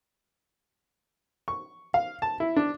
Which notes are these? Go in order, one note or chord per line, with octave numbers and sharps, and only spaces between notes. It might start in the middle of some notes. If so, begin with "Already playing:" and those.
C#6
F5
A5
E4
D4